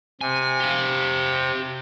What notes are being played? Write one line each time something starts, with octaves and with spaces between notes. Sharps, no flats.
C3 G#5
G4 F5